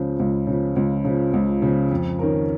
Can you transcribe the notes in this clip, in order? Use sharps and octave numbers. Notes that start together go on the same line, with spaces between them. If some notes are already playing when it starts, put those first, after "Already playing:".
Already playing: C#2 C#3 F3
C#2
C#3 F3
C#2
C#3 F3
C#2
C#3 F3
F2
D#3 C#4 A#4